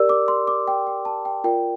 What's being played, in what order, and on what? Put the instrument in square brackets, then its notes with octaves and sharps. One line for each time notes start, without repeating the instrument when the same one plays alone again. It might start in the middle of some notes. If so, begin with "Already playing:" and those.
Already playing: [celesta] G4 A#4 D5 E6
D6
C6
D6
G5
G5
A5
G5
F4 A#4 D5 G5